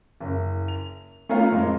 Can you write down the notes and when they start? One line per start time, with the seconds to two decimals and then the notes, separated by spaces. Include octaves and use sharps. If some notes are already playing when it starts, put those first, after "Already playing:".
0.20 F#1
0.68 F7
1.29 A3 B3 C#4 F4 F5 A#5
1.51 F2 A2 G#3 A#3